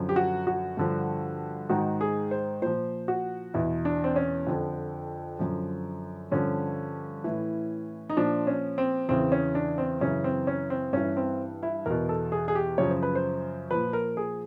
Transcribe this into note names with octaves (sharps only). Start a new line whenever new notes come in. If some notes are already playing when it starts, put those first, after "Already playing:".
Already playing: F#2 D3 F3
G4
F#4
F#4
G2 D3 F3
G#2 D#3 F#4
G#4
C5
A#2 F3 C5
F#4
E2 B2 E4
D4
C4
C#4
F2 D3 F3
F#2 D3 F3
G2 D3 F3 C#4
A2 E3
D#4
A#2 F3 D4
C#4
C4
E2 C#3 E3 C4
C#4
D4
C4
F#2 C#3 E3 C#4
C4
C#4
C4
G2 E3 C#4
C4
E4
E2 B2 A#4
A4
G#4
G#4
G4
F#2 C#3 F3 C#5
C5
B4
C5
A#2 F3 B4
A#4
G#4